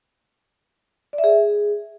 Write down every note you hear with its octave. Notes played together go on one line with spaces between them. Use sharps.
D5
E5
G#4